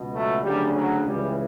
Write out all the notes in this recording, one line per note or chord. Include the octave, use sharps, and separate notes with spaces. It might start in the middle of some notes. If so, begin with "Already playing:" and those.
Already playing: C#2 B2
F#3 A3
D2 C#3 F#3 G3
F#3
C#2 C#3 E3 G3